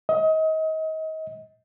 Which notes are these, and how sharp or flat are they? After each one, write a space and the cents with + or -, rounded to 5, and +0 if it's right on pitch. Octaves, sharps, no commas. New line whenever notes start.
D#5 +30